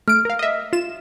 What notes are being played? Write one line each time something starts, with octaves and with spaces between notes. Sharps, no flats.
A3 F6 D7
A#4 F5
D#5 E5
F4 E7